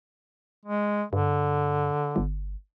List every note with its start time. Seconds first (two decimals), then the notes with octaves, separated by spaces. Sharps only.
0.65 G#3
1.13 G2 D3
2.16 G1